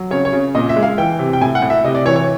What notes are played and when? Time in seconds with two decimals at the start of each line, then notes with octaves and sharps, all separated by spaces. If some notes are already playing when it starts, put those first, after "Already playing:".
Already playing: F#3
0.11 C#3 C#5
0.25 C#5
0.33 C#3
0.55 A#2 D#5
0.69 E5
0.76 G#3
0.83 F5
0.98 E3 G5
1.19 C3
1.33 G5
1.41 A2 G#5
1.55 F#5
1.62 A2
1.70 E5
1.84 C3 D#5
1.95 D5
2.05 E3 C#5
2.16 C#5